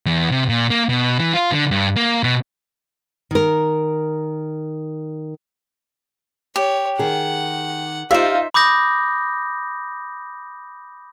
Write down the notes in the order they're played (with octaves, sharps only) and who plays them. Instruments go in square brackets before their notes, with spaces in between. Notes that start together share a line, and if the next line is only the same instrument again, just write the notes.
[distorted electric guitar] E2
C3
A#2
A#3
B2
E3
F4
D3
G2
A#3
B2
[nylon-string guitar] D#3 A#4
[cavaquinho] G4 [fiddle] C#5
[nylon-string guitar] D#3 G#4 [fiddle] F#5
[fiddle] D#4 [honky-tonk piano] F4 [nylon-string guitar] G4 D5 [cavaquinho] C5 E5
[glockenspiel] B5 D6 D#6 G6 A#6